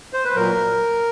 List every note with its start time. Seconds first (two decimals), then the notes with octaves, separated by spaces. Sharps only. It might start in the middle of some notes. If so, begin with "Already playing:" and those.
0.13 C5
0.25 B4
0.35 A#2 F#3 A#4